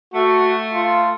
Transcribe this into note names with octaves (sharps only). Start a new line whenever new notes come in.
A3 F#4
F4